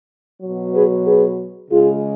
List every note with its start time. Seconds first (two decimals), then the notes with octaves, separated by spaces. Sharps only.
0.42 B2 F#3
0.74 G#4 B4
1.06 G#4 B4
1.70 C#3 G#3 F4 G#4